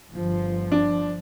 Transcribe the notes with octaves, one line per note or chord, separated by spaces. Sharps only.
G1 F3
D4